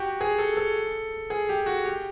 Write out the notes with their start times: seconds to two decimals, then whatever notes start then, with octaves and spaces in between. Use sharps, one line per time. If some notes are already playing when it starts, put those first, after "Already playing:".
Already playing: F#4 G4
0.21 G#4
0.38 A4
0.57 A4
1.30 G#4
1.49 G4
1.66 F#4
1.86 G4